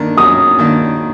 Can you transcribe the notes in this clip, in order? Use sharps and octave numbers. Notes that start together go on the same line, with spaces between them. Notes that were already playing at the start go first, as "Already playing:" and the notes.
Already playing: D#3 A#3 D4
F#2 D#6
D#3 A#3 D4